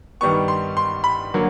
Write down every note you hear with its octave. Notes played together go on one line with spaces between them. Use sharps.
G2 D#3 G3 B3 C#6
C6
C6
B5
D3 F#3 A#3